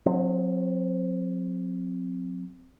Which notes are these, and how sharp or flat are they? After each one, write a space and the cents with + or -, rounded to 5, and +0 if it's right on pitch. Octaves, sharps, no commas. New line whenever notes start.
F#3 -35 C4 +0